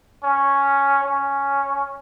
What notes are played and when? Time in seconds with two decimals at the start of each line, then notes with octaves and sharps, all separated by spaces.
0.23 C#4
1.04 C#4